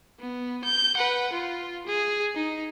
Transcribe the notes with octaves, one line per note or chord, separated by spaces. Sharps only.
B3
G6
B4 F#5
F4
G#4
D#4